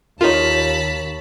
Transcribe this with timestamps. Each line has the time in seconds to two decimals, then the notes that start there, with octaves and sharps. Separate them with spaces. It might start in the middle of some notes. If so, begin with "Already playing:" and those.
0.21 D#2 D#4 F4 A#4 C#5 A5 B5